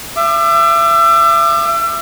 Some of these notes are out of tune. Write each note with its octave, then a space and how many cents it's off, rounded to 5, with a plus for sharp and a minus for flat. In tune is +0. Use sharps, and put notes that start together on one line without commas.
E5 +35 D6 +30